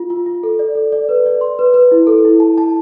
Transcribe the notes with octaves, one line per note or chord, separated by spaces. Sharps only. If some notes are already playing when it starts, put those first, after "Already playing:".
Already playing: F4
F4
F4
A4
D5
A4
D5
B4
D5
C6
B4
B4
E4
A4
E4
A5
A5